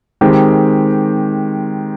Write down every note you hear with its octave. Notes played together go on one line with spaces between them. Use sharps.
D#3 G#3 C4 G4